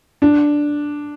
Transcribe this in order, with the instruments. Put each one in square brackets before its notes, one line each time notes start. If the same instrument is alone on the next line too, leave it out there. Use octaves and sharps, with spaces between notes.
[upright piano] D4